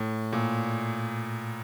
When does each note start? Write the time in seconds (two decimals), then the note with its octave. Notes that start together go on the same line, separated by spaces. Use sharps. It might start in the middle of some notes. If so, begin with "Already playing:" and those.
Already playing: A2
0.33 A#2